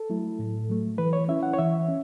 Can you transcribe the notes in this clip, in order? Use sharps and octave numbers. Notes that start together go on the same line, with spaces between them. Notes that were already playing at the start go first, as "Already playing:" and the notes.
Already playing: A4
F#3 A3 E4
A2
F#3 A3
E3 B4
C#5
C#4 E4 E5
F#5
C#5
E3 E5
C#4